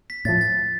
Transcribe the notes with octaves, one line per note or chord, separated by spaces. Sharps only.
B6
A2 F3 A6
A6